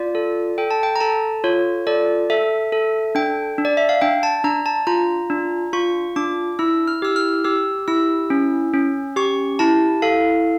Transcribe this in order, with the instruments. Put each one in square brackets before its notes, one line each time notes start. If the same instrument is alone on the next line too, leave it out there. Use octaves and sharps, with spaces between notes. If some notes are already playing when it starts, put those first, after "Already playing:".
Already playing: [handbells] F4 D5
A4
A4 G5
A5
G5
A#5
A4 A5
F4 C#5
A4 D5
A4 E5
A4
D4 G5
D4
D5
E5
F5
D4 G5
A5
D4 A#5
A5
F4 A#5
D4
F4 C#6
D4 D6
E4 E6
F6
G4 E6
F6
G4 E6
E4 E6
C#4
C#4
G4 C#6
E4 A5
A4 F5